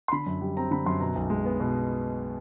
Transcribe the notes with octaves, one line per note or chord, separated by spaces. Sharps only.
C6
D3 B5
F#2
G3
C4 A#5
D3 B5
F#2 C6
B2 A#5
B1
G#3
B3
B2